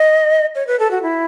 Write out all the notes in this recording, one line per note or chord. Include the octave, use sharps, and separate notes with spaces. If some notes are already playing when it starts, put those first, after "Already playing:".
Already playing: D#5
C#5
B4
A4
F#4
E4